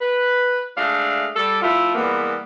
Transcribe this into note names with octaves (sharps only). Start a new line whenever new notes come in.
B4
G#3 A3 D4 D5 F5
G3 A4
F3 A3 E4 F4
E3 G3 G#3 A#3 B3